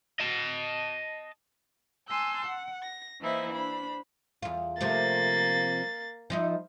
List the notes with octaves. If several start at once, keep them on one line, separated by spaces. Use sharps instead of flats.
D#5 A5
G#5 A5 C6 E6 F#6 G6
F#5
A#6
E3 A#3 D#4 E4 C5 E5
D4 C5 B5
E2 F4
C3 F3 A3 A#3 A6
F3 D#4 E4